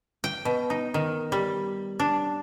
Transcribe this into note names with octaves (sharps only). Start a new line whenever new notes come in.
G5
B2
D#4
D#3
G3
D4